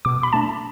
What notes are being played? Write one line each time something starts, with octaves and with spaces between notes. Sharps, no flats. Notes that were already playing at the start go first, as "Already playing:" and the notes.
B2 D6
B5
A3 D4 A5